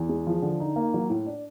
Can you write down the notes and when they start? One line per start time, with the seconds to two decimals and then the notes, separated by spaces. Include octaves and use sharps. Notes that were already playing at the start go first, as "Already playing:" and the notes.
Already playing: E2
0.09 G#3
0.27 F3
0.42 D3
0.60 D#4
0.76 A#3
0.94 F#3
1.09 A2
1.26 D4